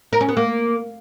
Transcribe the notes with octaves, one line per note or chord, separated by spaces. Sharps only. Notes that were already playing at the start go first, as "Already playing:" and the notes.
A#4
C#4
B3
A#3